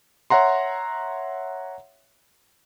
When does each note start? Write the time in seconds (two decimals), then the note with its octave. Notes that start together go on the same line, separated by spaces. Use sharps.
0.30 C#5 E5 F#5 A#5 C6